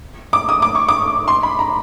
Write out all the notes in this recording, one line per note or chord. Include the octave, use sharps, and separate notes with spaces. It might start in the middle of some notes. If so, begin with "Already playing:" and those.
D6
D#6
D6
C#6
D6
C6
B5
A#5